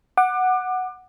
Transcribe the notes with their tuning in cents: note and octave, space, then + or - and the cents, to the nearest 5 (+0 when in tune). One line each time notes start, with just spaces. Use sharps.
F#5 +0 D6 +30